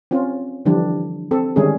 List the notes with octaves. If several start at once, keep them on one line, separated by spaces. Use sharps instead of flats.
C4 C#4 F4
D3 E3 F3 G3 D4
C4 A4
D3 D#3 G3 G#3 C#4 G#4